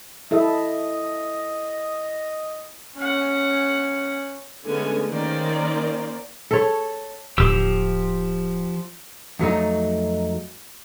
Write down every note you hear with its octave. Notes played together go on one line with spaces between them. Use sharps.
E4 A4 D#5 E5
C#4 F#5
D3 G#3 A3 B3 C#4 G#5
D#3 A#3 C#4 A#4 C5 D5
A4 C#5
D1 F3 G4 E6
F2 F#3 A3 D#4